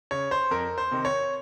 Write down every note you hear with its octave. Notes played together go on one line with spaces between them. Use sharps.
C#3 C#5
C5
F2 A#4
C5
C3 D#3
C#5